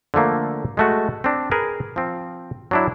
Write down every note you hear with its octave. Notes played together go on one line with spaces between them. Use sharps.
D3 F3 A3 A#3
G#3 A3 F#4
C4 D4
G#4 A#4 B4
F3 C4
F#3 D4 E4